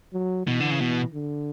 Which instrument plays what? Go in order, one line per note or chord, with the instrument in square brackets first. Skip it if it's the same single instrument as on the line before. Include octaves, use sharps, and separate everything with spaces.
[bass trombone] F#3
[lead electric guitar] B2 [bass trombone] E3
[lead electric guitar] D3
C#3
B2
[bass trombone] D3